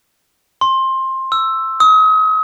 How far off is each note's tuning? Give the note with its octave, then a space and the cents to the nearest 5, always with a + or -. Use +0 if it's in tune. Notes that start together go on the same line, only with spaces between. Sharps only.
C6 +20
E6 +5
D#6 +35